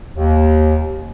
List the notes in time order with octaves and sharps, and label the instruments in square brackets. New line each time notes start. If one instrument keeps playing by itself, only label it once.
[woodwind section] D#2